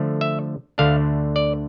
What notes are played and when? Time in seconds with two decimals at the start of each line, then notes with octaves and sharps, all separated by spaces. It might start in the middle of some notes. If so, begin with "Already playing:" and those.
Already playing: D3 F3 A3
0.21 E5
0.78 D2 D3 A3 D4 F5
1.36 D5